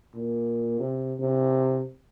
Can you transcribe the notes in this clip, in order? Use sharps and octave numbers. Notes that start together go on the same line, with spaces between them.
A#2
C3
C3